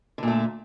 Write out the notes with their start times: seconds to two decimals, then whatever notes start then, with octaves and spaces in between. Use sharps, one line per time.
0.18 D3
0.23 A#2
0.27 A3